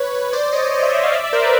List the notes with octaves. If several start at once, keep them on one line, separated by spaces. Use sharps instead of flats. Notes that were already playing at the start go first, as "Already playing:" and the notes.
Already playing: B4 C#5
C5 D5
C#5 D#5
C#5 D#5
D5 E5
D5 E5
D#5 F5
D5 E5
D5 E5
A#4 C5
B4